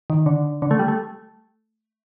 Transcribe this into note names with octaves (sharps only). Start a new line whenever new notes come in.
D#3
D3
D3
A3
G3
A3